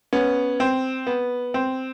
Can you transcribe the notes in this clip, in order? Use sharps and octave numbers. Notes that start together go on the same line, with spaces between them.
B3 C#4
C4
B3
C4